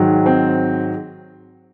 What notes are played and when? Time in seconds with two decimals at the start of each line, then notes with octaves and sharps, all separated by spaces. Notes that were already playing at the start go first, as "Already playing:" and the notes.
Already playing: G#2 D#3 F#3
0.26 C4